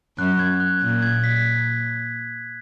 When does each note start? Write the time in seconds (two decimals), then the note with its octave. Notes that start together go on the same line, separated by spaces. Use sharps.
0.18 F#2 F#6
0.39 G#6
0.60 F#6
0.82 A#2
1.02 G#6
1.24 B6